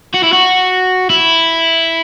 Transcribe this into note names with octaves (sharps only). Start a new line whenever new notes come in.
F#4
E4
F#4
E4